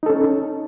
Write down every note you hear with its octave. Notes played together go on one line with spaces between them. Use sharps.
C#4 D#4 A4